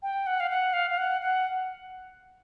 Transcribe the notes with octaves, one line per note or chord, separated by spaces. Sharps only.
G5
F#5
F5
F#5
F5
F5
F#5
F#5